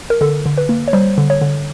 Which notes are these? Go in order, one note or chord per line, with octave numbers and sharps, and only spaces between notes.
A#4
D3 A4
D3
B4
A#3
C#5
G3 C5
D3
C#5
D3